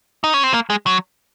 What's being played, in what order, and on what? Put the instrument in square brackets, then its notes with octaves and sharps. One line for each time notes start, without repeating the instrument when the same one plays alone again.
[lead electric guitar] D#4
C#4
C4
A#3
G#3
F#3